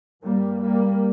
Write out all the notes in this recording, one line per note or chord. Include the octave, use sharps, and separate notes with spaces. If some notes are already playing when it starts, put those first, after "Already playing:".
G2 G3 A#3
G3 A#3